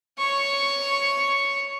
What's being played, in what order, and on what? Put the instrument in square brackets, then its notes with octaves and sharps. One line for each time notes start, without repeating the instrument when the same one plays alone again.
[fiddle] C#5 C#6